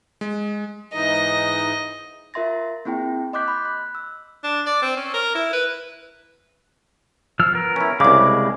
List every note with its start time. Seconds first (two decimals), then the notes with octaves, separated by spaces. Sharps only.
0.21 G#3
0.94 G#2 E3 D#4 D#5
2.34 F4 A#4 E5 C6 A6 A#6
2.85 A#3 C4 E4 G#4 G5
3.33 D#5 C6 D6 F#6 G6 B6
3.48 B5
3.65 F#6
3.95 E6
4.44 D4
4.66 D5
4.82 C4
4.97 C#4
5.14 A#4
5.35 E4
5.53 B4
7.39 F3 E6 F6
7.53 B3 A#4
7.76 C#4 E4
8.00 C2 C#3 G#3 B5 D6